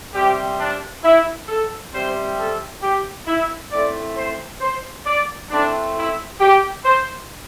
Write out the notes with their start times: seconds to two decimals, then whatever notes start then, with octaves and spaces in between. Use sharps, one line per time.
0.14 C3 G3 C4 G4
0.59 D4
1.03 E4
1.48 A4
1.92 C3 G3 C4 C5
2.37 A4
2.82 G4
3.27 E4
3.71 A2 A3 C4 D5
4.16 C5
4.60 C5
5.05 D5
5.50 A2 A3 C4 D4
5.95 E4
6.40 G4
6.84 C5